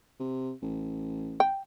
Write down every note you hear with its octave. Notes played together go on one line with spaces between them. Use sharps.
C3
A1
G5